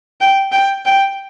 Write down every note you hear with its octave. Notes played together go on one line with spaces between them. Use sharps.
G5
G5
G5